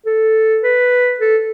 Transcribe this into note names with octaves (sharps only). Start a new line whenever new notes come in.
A4
B4
A4